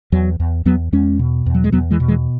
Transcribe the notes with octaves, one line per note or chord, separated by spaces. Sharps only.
E2 F#3
E2
E2 F#3 B3
E2 G#3 C#4
B2
E2
F#3
G#3
E2 F#3 B3
E3 G#3
B2
E3 G#3